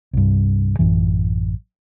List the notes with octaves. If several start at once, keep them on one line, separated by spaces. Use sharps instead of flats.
C2 G2
A1 F#2 E3